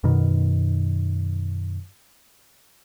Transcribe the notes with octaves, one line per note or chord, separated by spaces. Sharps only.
F#2 B2 D#3